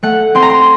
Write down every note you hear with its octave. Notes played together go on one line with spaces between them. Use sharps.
A3 F#5
C4 C6
A#5
C6